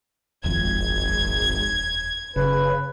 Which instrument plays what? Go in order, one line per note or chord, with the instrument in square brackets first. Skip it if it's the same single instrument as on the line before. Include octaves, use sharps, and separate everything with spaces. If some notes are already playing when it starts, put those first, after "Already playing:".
[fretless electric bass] D#1 F2 [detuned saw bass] G#1 [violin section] G#6
[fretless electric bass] F#1 [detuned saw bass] C#3 [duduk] B4